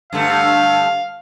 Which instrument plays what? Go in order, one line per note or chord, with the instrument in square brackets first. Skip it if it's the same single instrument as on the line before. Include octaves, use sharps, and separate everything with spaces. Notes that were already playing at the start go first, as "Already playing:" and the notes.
[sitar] G2 D3 A3 [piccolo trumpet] F5